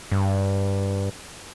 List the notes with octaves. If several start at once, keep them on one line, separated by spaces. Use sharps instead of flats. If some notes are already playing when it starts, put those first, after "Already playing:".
G2